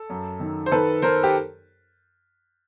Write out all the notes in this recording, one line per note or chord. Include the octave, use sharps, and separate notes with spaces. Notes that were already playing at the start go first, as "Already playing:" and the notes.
Already playing: A4
F#2
D#3
C5
D#3 A4 B4
D#3 A#4 C5
G4